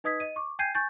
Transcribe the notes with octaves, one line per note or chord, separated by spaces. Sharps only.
D#4 B4 D#5 D#6 G#6 B6
D#5 D#7
C#6 D6
G5 G#5 G6 G#6 C7 D#7
G#5 C#6 G6 A6